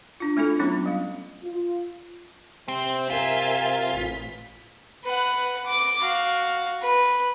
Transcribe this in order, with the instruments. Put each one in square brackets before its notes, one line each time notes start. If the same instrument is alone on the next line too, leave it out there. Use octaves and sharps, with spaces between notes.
[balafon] D4 F4
A3 C4 E4 F4 A4
F#3 B3 C#4 E4 F4
G3 F5
[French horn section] F4
[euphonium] C3 [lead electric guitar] C4
[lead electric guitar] F4 [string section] A#4 E5 G#5
[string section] A1 B6
[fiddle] B4 F#5
D6
F#4 F5
B4